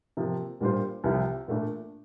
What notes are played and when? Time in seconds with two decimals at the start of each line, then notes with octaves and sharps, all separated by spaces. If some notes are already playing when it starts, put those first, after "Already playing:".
0.17 C3 F3 A#3
0.61 A#2 G3 D4 F4 C5
1.04 C2 C3 F3
1.48 A#2 A3 D4